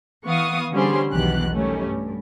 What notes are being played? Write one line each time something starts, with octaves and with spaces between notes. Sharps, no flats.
E3 B3 F5 C#6 D#6
D3 G3 C#4 G#4 C5 C6
B1 E2 B2 D#3 G4 F#6
D#3 G3 A3 C#4
G2